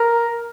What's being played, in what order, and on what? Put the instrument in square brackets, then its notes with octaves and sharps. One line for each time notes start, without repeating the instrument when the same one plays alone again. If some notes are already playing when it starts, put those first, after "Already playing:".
Already playing: [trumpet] A#4